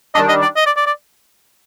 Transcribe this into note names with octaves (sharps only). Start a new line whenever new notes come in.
D#3 G3 D4 D#5
D#5
D5
D#5
D5
D5
D5